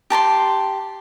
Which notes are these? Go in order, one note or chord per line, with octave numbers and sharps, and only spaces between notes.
G4 A5 A#5 C6